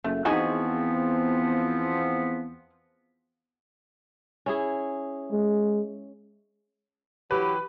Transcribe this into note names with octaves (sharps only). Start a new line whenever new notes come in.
F#1 A3
E2 F3 B3 C4 D#4 F#4 G#4
C#4 E4 G#4
G#3
E3 F#3 G4 B4